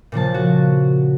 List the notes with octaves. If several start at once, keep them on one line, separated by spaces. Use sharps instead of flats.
A#2 C#3 F3 A5
F#4